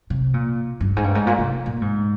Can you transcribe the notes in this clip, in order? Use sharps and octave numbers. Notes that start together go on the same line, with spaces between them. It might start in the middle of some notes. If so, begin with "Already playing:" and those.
C3
A#2
G2
G#2
G2
G#2
A#2
C3
A#2
G#2